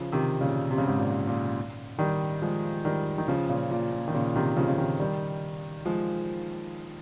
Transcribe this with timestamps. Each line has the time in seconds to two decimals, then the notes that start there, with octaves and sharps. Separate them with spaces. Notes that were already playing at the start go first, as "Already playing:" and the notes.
Already playing: C#3 F3
0.12 C3 D#3
0.41 A#2 C#3
0.71 C3
0.78 C#3
0.86 G#2 C3
0.98 A#2
1.27 A#2
1.99 D#3 G3
2.42 F3 G#3
2.85 D#3 G3
3.18 D#3
3.28 C#3 F3
3.49 A#2 C#3
3.71 A#2
3.92 A#2
4.08 D#3
4.14 A#2 C#3
4.36 C3 D#3
4.56 C#3 F3
4.69 C#3
4.78 C3 D#3
5.00 D#3 G3
5.86 F3 G#3